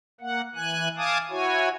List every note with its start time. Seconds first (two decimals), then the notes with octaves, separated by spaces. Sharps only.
0.21 A#3 F#5
0.55 E3 G#5 F#6
0.97 F5 G#5 A5 D6 D#6
1.30 E4 F#4 C#5 G#5